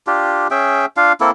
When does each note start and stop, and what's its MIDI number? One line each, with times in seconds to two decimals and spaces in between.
0.07 0.47 62
0.07 0.47 65
0.07 0.47 67
0.51 0.86 61
0.51 0.86 68
0.51 0.86 76
0.51 0.86 79
0.97 1.12 62
0.97 1.12 65
0.97 1.12 77
1.21 1.31 58
1.21 1.31 60
1.21 1.31 64
1.21 1.31 69